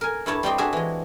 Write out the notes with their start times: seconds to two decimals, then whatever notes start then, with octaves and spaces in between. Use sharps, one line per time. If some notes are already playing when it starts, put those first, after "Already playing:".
0.01 A#4 G#5
0.26 G2 E4 C#5 A5
0.43 G3 C4 G4 D#5
0.58 D4 F#4 G#4 E5
0.73 E3 G#3